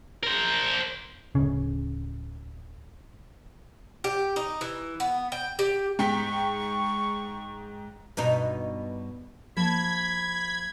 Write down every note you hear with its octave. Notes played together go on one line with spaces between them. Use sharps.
A#4 C5
D1 C#3
G4
D#4
E3
B3
G5
G4
G#2 G5 C#6 B6
G2 B2 D#4
F3 A#3 A5 B5 G#6